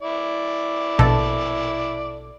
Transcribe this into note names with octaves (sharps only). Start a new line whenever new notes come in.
E4 D5
A#1 B2 A4